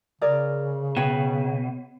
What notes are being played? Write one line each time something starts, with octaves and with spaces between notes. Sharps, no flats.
C#3 G#4 A#4 D5
B2 C#5 G5 B5